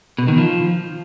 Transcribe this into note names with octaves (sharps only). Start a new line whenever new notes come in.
B2
D#3
F3